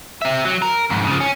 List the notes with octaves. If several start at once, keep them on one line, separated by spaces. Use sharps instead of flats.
C4 E5
F#3
A#4
F2 G#2
C#3 F3
C#4